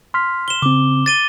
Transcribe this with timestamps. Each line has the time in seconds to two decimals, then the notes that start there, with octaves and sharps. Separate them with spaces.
0.14 C6 F6 B6
0.48 E7 G7
0.62 C#3 C4 D6
1.06 A6 D#7 G7